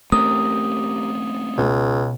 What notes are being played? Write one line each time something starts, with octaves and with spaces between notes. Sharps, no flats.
A3 C4 C#4 G4 A#4 D#6
C#2 B2